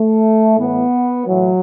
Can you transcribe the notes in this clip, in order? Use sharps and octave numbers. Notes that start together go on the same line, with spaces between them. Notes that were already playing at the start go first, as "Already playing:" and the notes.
Already playing: A3
A2 E3 B3
A2 E3 F#3